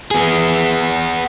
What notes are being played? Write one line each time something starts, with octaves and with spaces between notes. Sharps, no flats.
B3 G#4